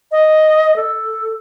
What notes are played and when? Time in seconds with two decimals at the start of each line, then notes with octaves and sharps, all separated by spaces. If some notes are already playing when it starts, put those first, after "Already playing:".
0.12 D#5
0.76 A4